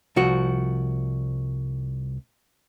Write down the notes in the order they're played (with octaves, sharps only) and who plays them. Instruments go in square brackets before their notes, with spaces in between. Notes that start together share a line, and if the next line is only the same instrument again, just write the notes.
[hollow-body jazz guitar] C2 F3 F#4